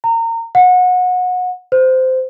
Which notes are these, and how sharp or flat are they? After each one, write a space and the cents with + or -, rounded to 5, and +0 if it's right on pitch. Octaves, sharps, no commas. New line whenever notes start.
A#5 -30
F#5 -25
C5 -15